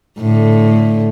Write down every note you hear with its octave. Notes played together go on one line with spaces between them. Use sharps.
A2 D3